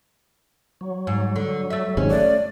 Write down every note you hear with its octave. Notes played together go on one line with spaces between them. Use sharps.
F#3
G#2
D3
A3 E5
G#1 G#2 C3 C#4
A3 D5